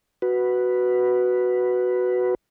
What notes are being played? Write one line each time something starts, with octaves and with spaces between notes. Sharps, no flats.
F#4 B4